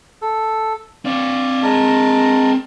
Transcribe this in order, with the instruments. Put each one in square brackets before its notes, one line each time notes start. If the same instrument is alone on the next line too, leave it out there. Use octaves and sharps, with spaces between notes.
[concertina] A4
[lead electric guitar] C4 C#5 [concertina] D5 F5
[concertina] G#3 A#4 A5